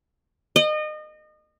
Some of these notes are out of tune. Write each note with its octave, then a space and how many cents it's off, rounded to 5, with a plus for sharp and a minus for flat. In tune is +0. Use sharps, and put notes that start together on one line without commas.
D#5 -30